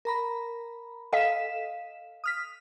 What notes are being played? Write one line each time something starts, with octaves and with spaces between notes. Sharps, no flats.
A#4 A#5 B5
A4 D#5 F5 B6 E7
D#6 F6 B6